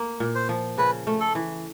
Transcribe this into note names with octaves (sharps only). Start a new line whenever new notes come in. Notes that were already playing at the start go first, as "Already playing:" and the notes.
Already playing: A#3
A#2
C5
F3
C#3 B4
A3
A4
E3